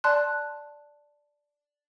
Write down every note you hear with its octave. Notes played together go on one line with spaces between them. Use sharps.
D5 A5 C6 F#6